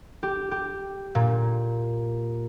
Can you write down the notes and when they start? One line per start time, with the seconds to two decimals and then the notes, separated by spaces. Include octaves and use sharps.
0.23 G4
0.51 G4
1.15 A#2